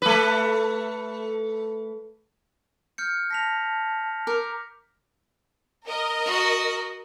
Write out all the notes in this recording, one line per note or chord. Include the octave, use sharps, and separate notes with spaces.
A3 B4
F6 G6 C#7
A5 A#6 B6 F7
A#4 D6
A#4 D#5
F#4